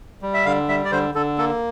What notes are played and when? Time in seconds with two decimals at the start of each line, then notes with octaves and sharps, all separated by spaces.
0.22 G3
0.34 E5
0.45 D3 F5
0.69 G3 E5
0.85 D5
0.92 D3 C5
1.15 D3 A4
1.38 A#3 A4